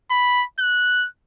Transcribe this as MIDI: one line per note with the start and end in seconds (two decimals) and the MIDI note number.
0.11 0.45 83
0.59 1.07 90